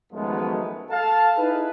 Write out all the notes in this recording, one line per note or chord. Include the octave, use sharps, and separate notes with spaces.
F#2 D#3 F3 G#3 A3 B3
A4 F5 A5
D#4 E4 G#4 B4